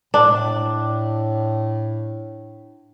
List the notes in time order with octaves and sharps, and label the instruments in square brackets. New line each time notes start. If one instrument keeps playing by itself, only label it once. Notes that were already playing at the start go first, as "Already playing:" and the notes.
[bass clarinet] A2 [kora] D4